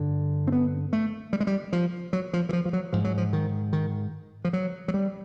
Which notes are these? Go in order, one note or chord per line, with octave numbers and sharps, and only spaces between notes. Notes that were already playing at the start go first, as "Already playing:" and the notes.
Already playing: G2 D3
C4
B3
A3
G3
G#3
G3
F3
F#3
F3
E3
F3
F3
F#3
G#2 F3
F#3
F3
D#3
D#3
F3
F#3
F#3
G3